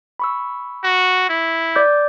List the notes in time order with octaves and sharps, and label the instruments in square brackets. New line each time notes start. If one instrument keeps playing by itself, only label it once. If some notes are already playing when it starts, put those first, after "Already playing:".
[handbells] B5 C#6 E6
[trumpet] F#4
E4
[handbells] D5 D6 G6